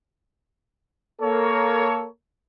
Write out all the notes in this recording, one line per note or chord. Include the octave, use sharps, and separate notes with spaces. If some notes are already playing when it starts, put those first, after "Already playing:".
A#3 A4 A#4 C#5